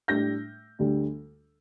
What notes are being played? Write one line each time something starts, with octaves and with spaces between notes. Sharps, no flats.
A2 G3 D4 G6 A#6
D2 D3 G3 D4